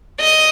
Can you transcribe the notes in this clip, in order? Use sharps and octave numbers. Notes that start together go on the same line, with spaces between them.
D#5